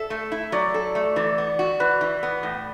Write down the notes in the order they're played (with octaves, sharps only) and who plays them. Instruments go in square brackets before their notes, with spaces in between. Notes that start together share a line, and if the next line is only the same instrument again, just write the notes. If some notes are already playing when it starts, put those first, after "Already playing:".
Already playing: [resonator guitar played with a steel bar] A4 [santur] E5
[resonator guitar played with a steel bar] A3
E4
[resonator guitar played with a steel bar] F#3 [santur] D5
[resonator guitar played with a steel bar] A4
A3
[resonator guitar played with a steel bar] E3 [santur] D5
[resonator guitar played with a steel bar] B3
F#4
[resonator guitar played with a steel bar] E3 [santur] B4
[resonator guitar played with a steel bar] E3
B3
A2